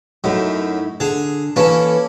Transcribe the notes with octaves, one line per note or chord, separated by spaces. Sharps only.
F#2 A3 D#4 E4
D3 G#4
E3 A#3 C#4 A4